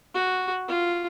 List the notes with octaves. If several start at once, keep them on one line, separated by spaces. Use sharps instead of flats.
F#4
F4